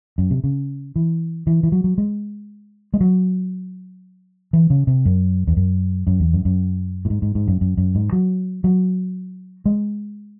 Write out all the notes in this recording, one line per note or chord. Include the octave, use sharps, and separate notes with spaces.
F#2
C3
C#3
E3
E3
E3
F#3
F#3
G#3
G#3
F#3
E3
C#3
C3
F#2
E2
F#2
F#2
E2
F#2
F#2
A2
G#2
G#2
G#2
F#2
F#2
F#2
G#2
F#3
F#3
G#3